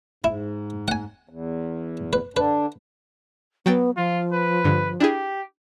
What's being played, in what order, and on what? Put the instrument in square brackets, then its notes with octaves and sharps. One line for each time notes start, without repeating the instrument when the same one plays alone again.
[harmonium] G#2 [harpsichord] E4
[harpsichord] F#5 G#5
[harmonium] E2
[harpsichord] B4
[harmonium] D3 D4 [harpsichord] B4
[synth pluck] F#3 G5 A6 [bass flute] B3
[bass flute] F3 [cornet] F4
[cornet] B4
[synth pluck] G2 D3
[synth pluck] D4 E4 G#4 [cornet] G4